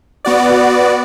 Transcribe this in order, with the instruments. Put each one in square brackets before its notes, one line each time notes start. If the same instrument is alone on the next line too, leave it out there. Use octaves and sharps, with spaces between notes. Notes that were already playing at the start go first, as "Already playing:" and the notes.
[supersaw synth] B3 F#4 D5